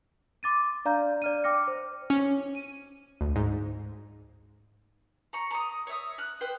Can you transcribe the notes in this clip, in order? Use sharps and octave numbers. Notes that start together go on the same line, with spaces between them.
C6 D6 A6 D#7
D4 D5 F5 A#5 F6 G6
D5 F6 D#7
G5 D6 F6 A#6 C#7
C5
C#4
D#7
D2
G#2
A#5 C#6
A#5 C#6 D#6
C#5 E5 D#6
F6 F#6
B4 C5 G5